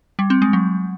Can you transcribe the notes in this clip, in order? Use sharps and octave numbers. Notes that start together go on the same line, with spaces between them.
G3
C4
G#3
F#3